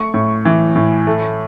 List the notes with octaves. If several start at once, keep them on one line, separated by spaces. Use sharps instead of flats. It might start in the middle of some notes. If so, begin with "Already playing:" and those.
Already playing: A3 C#6
A2
E3
A2
A3